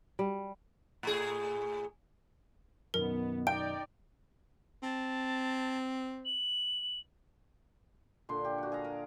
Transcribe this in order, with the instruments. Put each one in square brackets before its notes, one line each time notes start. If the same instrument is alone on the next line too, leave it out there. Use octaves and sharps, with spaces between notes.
[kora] G3
[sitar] A2 G#4
[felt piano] F#2 B2 D#3 [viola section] B3 [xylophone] A#4
[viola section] D#4 D5 [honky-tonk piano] G5 [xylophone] D7
[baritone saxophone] C4 [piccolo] A5
[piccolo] F#7
[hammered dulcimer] A#2 D3 C6
G4
F#4 F#5
G#4 F5 A#5
A#4